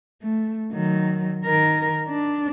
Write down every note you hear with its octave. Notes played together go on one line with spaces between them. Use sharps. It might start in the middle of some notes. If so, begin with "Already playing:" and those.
A3
D#3 F#3
D#3 A#4
D4